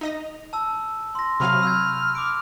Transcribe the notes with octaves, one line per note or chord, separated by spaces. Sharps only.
D#4 D#5 A#6 F7
A5 E6
C6 A#6
C3 F#3 F5 B5 C#6 F6 D#7
E6 G6 G#6
D6 D#6 D7